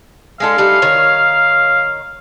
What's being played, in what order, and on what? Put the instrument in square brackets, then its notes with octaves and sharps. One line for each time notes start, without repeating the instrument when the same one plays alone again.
[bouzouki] G#3 D4 A4 [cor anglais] F5
[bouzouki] G3 A3 D#4
D#3 C#5